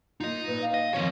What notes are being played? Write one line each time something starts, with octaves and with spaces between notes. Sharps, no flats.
A#3 D#4 F4 D#5
A#2 B4
F5
D#5
F2 D#3 C4 F4 C#5